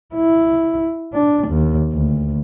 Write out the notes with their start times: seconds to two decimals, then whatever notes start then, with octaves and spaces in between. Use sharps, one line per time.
0.14 E4
1.13 D4
1.47 D#2
1.92 D2